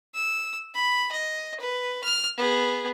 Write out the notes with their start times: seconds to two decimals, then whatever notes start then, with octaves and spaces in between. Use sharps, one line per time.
0.15 E6
0.74 B5
1.12 D#5
1.60 B4
2.04 F6
2.37 B3 G#4